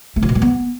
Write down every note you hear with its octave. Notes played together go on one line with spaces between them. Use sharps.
A3
F3
B2
G#3
B3